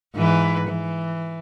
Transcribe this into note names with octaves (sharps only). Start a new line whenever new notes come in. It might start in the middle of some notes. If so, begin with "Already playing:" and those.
G#2 E3 B4
E3